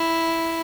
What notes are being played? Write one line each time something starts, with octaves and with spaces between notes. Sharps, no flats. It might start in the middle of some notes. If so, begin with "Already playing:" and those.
Already playing: E4